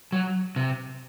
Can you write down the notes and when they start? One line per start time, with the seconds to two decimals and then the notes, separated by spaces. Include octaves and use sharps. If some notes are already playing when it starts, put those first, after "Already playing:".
0.12 F#3
0.56 C3